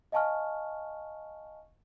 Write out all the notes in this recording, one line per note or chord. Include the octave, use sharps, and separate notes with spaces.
D#5 F5 G#5 A5 C#6 F6